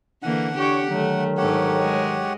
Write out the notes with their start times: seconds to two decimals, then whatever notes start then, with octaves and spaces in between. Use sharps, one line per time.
0.23 D3 E3 A#3 F#5
0.58 D4 G4 C#5 C#6
0.87 D3 D#3 F#3 A3
1.38 G#2 G4 A4 C#5 F#5
1.76 G#3